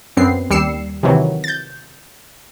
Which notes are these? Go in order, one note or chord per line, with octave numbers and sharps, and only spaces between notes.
F#2 B3 C4 C7
D#2 G3 E6 C7 C#7 E7
C3 D#3 E3 F#3
G6 A6